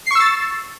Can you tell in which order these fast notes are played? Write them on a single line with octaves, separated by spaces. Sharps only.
C7 C#6 E6 A6